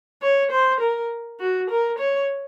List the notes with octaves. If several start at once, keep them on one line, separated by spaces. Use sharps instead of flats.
C#5
C5
A#4
F#4
A#4
C#5